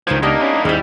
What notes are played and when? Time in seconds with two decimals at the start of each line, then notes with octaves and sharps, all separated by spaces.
0.07 C#2 D#3 F3 D#4 B4 C5 G#6
0.23 A#3 B3 D4 D#4 G4 A#4
0.41 A#3 C#4 E4
0.65 D#2 G#2 G3 C#4 E4